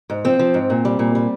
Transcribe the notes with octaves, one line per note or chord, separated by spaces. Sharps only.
G#2
F3 C4
F3
G#2
A#2
G3
A#2
G3